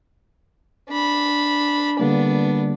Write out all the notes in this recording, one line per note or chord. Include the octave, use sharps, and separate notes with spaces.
D4 B5
D3 G3 A#3 B3 D4